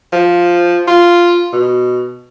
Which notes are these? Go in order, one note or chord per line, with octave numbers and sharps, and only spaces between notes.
F3
F4
B2